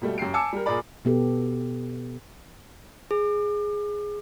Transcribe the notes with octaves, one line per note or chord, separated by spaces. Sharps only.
B2 G3 A3
F#2 G4 C7 D7
G#5 A5 D6 E6 C#7
G3 A#4
A#2 G#4 A#4 D5 B5
B2 B3 G4 A4
G#4